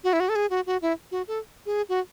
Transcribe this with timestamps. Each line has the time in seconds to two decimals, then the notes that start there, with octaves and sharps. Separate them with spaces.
0.04 F#4
0.13 E4
0.20 F#4
0.29 A4
0.35 G#4
0.50 F#4
0.66 F#4
0.82 E4
1.12 F#4
1.28 A4
1.66 G#4
1.89 F#4